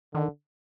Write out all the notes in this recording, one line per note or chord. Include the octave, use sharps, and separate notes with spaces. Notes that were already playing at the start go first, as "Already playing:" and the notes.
D3 D#3